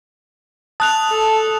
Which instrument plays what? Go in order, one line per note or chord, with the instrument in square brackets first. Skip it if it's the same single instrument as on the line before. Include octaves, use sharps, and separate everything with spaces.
[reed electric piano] A5 [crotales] D#6 F#6 F7
[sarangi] A4